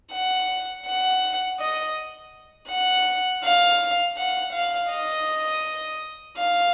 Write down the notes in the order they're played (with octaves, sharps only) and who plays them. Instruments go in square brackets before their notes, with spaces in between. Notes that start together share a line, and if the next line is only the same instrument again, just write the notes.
[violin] F#5
F#5
D#5
F#5
F5
F#5
F5
D#5
F5